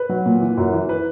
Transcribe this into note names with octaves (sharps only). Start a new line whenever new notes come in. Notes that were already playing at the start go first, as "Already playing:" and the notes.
Already playing: B4
F#3
A#2
E3
F#2
E3
B4